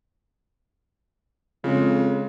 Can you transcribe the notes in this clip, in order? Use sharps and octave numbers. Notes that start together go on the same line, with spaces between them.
F2 C#3 G#3